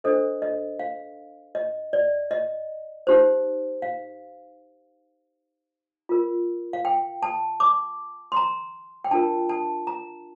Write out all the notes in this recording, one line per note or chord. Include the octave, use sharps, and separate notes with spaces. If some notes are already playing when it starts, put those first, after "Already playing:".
D4 A4 C5 D#5
D#5
F5
D#5
D5
D#5
D#4 G4 C5
F5
F4 A#4
F5
G5
A5
D6
C6
A#5
G5
D4 F4 A#4 A5
A5
A#5